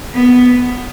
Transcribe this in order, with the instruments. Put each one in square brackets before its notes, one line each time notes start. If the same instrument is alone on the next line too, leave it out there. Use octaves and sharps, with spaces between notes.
[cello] B3